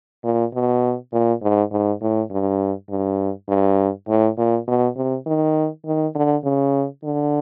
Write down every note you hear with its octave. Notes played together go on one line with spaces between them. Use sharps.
A#2
B2
A#2
G#2
G#2
A2
G2
G2
G2
A2
A#2
B2
C3
D#3
D#3
D3
C#3
D3